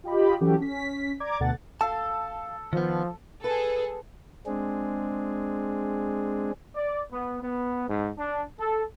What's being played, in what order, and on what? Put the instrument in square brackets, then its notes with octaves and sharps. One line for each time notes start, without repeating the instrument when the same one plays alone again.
[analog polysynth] F4 G4 D#5 B5
E3 F#3 C#4 F#4 G4 A4
C#4 B6
D5 A#5 D6 G#6
D2 B2 A4 F#5 A6
[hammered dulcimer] A4 [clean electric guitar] F5 A5
[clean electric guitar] D#3 B3 [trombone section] F3
[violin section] G#4 A4 [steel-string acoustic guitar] B4
[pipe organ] G#3 C4 D4 G#4
[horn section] D5
B3
B3
G#2
D4
A4